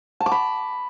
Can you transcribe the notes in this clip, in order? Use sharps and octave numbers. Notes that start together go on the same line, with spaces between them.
A5
D6
B5